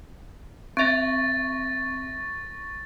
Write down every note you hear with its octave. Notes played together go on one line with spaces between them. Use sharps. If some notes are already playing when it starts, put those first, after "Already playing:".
C4 E5 C#6 A6 A#6